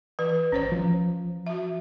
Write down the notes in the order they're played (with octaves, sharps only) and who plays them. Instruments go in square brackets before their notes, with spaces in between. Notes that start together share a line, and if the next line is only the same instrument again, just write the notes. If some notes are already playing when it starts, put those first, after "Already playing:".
[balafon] E3 B4
[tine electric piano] G#1 [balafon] C#4 C5 C#5
[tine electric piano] F3
[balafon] F#4 E5